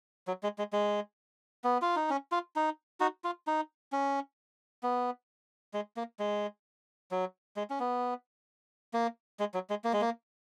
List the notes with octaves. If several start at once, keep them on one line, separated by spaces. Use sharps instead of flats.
F#3
G#3
G#3
G#3
B3
F4
D#4
C#4
F4
D#4
D#4 F#4
F4
D#4
C#4
B3
G#3
A#3
G#3
F#3
G#3
C#4
B3
A#3
G#3
F#3
G#3
A#3
G#3
A#3